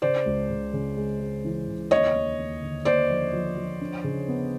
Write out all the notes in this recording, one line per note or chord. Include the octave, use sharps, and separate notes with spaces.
C#3 C5 D5
C#2
C#3
C#3
G#3
G#3
E3
C#3
D#2 C#5 D#5
D#2
D#2
D3
D#2 C5 D5
F3
F3
F3
D4
C#3
B3